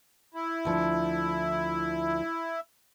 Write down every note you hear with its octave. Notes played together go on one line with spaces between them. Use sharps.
E4
D2 F3